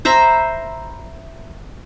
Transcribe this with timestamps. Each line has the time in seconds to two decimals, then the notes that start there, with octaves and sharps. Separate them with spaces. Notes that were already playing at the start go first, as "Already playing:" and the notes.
0.05 C5 E5 A#5 B5